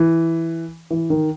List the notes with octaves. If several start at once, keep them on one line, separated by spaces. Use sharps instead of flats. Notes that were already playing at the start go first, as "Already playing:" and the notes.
Already playing: E3
E3
D#3